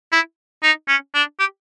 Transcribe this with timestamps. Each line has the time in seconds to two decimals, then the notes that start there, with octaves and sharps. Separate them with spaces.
0.12 E4
0.63 D#4
0.88 C#4
1.14 D4
1.40 G4